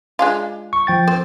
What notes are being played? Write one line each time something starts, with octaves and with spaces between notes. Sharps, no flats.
G#3 D4 F4
C#6
F3 G5 A6
C4 C5